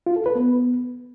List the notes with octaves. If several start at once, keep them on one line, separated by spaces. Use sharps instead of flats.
F4
A4
B4
B3